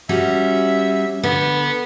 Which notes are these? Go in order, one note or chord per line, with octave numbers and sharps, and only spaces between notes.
G3 C#4 F#4 E5
D3 B3